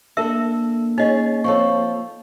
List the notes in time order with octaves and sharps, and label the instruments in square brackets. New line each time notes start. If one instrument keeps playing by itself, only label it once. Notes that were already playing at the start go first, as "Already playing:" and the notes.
[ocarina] A#3 [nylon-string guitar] D4 A4 [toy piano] A#4 E5 [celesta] E6
[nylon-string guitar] C#4 G#4 C#5 [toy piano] D#4 D#5
[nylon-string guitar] F3 C4 A4 [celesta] C#5 C#6